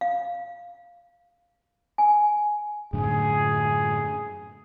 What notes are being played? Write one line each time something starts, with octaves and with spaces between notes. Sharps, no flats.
F5
G#5
F#2 A2 D3 G#4